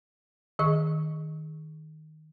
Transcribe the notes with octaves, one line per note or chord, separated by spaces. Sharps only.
D#3 G#4 D#5 C#6